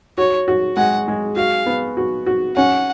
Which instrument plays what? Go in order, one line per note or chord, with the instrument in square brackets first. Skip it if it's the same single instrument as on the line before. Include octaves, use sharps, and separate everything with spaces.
[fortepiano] F#4 [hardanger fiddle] C#5
[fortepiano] F#4
[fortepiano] G#3 [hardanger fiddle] F#5
[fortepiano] G#3
[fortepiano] F#4 [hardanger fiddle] F5
[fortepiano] B3
F#4
F#4
[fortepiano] C#4 [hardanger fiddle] F#5